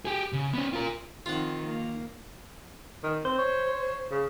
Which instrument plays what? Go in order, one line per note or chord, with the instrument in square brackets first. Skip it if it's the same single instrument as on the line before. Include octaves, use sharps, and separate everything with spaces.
[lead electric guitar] G4 G#4
C#3
B3 C#4
F4 A#4
[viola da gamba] D#3 F3 C4 [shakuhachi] D#4 [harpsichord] F4 F#5
[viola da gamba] A#3
[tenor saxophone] D#3
[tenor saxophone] C4 [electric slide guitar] C5
[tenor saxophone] C#5
C#3